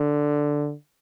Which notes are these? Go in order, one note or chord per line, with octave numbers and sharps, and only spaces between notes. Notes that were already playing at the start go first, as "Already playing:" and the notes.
Already playing: D3